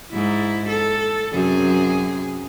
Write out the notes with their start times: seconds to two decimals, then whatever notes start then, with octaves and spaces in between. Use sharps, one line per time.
0.12 G#2 E4
0.69 A4
1.33 F#2 C3 G#4